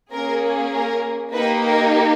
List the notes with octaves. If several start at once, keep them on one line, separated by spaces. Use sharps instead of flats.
A#3 C#4 G#4 A#4
A#4
A#3 D#4 G4 B4
A#4